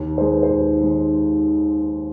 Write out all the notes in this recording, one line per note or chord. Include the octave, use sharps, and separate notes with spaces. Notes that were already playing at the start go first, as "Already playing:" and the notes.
Already playing: D#2
D#3 G#3 C5
B4
C5
D#2
D#3 G#3